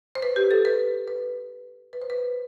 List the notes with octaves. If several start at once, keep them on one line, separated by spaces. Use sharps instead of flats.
C5
B4
G4
A4
B4
B4
B4
C5
B4